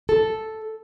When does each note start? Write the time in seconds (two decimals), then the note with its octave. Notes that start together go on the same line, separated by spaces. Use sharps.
0.09 A4